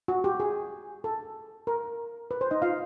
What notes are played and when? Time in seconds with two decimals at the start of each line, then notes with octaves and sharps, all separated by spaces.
0.08 F#4
0.24 G4
0.40 G#4
1.04 A4
1.67 A#4
2.31 B4
2.41 C5
2.51 D#4 D#5
2.62 F4 F5